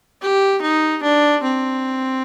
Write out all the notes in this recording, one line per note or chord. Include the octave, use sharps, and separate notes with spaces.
G4
D#4
D4
C4